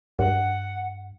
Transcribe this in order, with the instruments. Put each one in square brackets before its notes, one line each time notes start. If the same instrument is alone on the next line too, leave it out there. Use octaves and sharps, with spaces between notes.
[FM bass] G2 [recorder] F#5